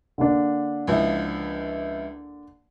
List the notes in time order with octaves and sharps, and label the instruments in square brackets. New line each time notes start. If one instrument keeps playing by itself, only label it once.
[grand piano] D3 A#3 D4
[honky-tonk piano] C#2 F3 E4